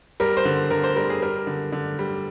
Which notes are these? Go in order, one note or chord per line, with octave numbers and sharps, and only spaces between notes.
G3 A#4
C5
D3
D3 A#4
C5
G3 A#4
G#4
G3 A#4
D3
D3
G3